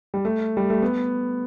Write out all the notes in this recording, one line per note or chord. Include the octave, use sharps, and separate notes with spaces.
G3
A3
G3
A3
B3